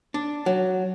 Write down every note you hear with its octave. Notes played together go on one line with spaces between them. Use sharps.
D4
F#3